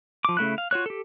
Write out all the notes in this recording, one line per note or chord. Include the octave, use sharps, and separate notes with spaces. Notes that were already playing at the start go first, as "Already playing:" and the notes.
F3 D6
C#3 A3 E4 F#6
F5
F4 F#4 C#5 F#6
G4 A4